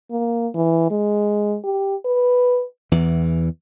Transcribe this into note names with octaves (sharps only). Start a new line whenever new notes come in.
A#3
E3
G#3
G4
B4
E2 E3